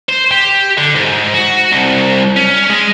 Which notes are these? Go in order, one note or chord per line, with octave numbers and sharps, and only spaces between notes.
C5
G4
D3
G#2
F#4
C2
C#4
G#3